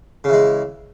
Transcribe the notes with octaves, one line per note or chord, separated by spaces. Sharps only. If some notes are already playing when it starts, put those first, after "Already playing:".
C#3 E3 G#3